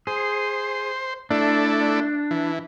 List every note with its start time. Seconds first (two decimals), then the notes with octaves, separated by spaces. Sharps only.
0.07 G#4 C5
1.31 A3 D4 E4 D5
2.31 E3